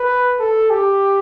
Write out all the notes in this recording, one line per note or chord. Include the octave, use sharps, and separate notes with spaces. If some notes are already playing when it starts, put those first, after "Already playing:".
Already playing: B4
A4
G4